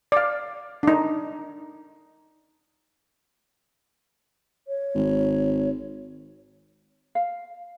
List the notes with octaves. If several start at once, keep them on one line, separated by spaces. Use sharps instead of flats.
D5 F5
D4 D#4
C#5
G#1
F5